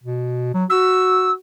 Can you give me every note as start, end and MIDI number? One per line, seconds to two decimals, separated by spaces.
0.04 0.50 47
0.54 0.64 54
0.70 1.35 66
0.70 1.31 88